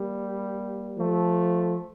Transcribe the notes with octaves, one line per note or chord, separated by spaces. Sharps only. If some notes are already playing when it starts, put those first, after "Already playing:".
Already playing: G3 A#3
F3 A3